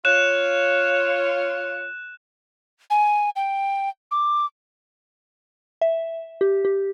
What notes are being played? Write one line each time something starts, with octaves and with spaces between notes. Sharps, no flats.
F4 C#5 F#6 E7
G#5
G5
D6
E5
G4
G4